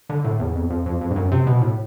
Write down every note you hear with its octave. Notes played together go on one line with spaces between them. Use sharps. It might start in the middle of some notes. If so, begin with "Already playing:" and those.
D3
A2
E2
F2
F2
F2
F2
G2
F#2
C3
B2
A2